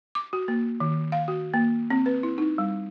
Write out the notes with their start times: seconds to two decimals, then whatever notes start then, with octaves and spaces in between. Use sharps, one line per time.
0.15 D6
0.33 F#4
0.48 A#3
0.80 D#3
1.12 F5
1.28 F#4
1.54 A#3
1.90 C4
2.06 B4
2.23 E4
2.38 D#4
2.58 G3